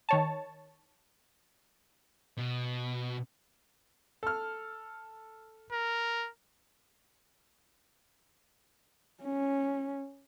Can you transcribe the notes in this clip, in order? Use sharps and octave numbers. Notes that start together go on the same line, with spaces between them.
D#3 C#5 A5
B2
A4 F6
A#4
C#4